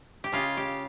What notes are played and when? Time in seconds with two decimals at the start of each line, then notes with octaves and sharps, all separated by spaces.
0.24 G4
0.32 C#3 G#3 F4
0.57 G4